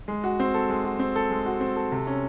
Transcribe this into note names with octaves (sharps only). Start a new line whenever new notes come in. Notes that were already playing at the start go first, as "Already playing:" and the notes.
G#3
F#4
C4
A4
G#3
F#4
C4
A4
G#3
F#4
C4
A4
C3
C#4